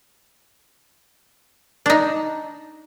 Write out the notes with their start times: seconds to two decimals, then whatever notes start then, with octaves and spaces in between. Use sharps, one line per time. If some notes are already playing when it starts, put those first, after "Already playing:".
1.86 D4 D#4